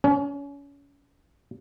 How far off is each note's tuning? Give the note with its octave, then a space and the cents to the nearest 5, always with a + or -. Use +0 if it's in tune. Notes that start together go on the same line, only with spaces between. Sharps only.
C#4 +30